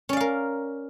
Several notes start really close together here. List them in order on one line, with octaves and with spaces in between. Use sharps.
C#4 D5 F5 A#4